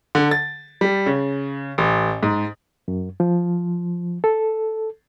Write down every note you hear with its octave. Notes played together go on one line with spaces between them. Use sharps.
D3
A6
G3
C#3
A1
G#2
F#2
F3
A4